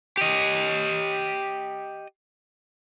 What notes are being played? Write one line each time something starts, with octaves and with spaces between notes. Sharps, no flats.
G4 D#5